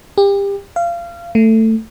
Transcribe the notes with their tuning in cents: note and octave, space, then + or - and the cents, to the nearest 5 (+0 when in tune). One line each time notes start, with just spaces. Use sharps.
G4 +30
F5 -25
A3 +15